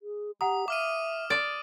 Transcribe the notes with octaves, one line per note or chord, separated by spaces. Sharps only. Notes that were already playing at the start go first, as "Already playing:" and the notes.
G#4
G4 F#5 A#5 D#6
E5 F5 D6 F6 D#7
D5